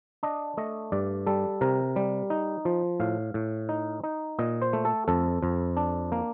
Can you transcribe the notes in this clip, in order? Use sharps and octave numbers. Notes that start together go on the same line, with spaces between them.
D4 D#5
A3 D#5
G2 D5
G3 A4
C3 A#4
G3
D#4
F3
A2 F5
A2
D#4
D#4
A#2 D#5
C5
A3
A4
F2 A4
F2
D4
A#3